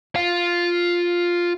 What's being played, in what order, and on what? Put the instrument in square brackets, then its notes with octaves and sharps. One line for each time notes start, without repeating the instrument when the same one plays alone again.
[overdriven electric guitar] F4